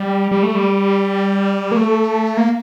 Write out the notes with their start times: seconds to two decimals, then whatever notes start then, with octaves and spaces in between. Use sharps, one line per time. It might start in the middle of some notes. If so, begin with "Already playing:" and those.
Already playing: G3
0.31 G3
0.43 A3
0.55 G3
1.72 A#3
1.76 A3
2.37 A#3